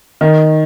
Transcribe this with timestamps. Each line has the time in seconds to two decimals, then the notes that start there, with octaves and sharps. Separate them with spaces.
0.21 D#3